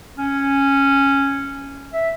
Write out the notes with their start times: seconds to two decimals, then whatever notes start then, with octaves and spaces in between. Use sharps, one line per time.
0.18 C#4
1.93 E5